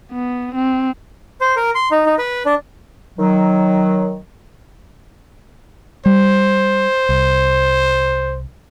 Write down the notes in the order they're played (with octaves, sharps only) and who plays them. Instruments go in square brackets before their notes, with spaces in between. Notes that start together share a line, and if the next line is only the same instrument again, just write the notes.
[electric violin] B3
C4
[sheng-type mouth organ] C5
A#4
C6
D#4
D#4
B4
D4
[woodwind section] D#3 F#3
[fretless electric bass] G3 [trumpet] C5
[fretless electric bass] C2